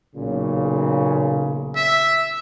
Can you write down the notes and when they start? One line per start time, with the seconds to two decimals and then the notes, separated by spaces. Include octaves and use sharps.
0.15 B1 A#2 C#3
1.76 E5